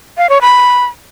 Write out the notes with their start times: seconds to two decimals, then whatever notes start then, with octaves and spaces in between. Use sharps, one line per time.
0.17 F5
0.29 C#5
0.41 B5